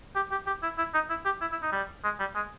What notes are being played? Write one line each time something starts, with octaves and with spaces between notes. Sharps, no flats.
G4
G4
G4
E4
E4
D#4
E4
G4
E4
E4
D#4
G3
G#3
G3
G#3